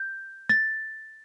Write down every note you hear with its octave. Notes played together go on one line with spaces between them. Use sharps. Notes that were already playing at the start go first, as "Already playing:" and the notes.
Already playing: G6
A6